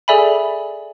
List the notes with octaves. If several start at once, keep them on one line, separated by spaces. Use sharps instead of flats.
G#4 A4 D5 E5 G#5 B5